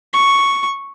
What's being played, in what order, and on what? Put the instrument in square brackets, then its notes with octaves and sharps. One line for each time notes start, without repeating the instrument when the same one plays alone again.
[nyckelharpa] C#6